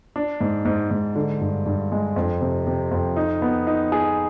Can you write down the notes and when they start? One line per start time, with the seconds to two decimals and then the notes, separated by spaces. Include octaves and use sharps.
0.16 D4
0.41 G#2
0.65 G#2
0.91 G#2
1.15 D3
1.41 G2
1.66 G2
1.92 G#3
2.16 F2
2.41 C3
2.67 C3
2.91 F2
3.16 D#4
3.42 B3
3.67 D#4
3.92 G#4